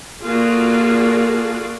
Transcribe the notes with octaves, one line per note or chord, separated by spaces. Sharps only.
A#3 F4 F#4 G#4 A4 D5